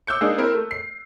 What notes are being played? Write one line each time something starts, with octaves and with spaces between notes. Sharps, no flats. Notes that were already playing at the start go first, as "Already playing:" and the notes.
D6 E6 F#6 G6 C#7
G#3 A#3 D4 D#4 G#4
C4 E4 A#4
A3
C7